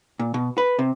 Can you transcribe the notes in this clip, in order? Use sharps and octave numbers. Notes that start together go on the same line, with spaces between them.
A#2
B2
B4
C3